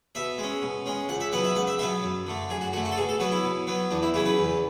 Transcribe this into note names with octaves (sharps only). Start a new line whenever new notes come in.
B2 E5
G#3 C#4
B2
G#3 C#4
C#2 F#5
E5
B2 F#3 B3 F#5
E5
C#2 F#5
E5
B2 F#3 B3 E5
F#2
D3 A3
F#2 G#4
F#4
D3 A3 F#4
F#4
A4
B2 G#4
A4
F#3 B3 F#4
E4
B2
F#3 B3
E2 D4
E4
C#3 F#3 C#4 E4
B4
E2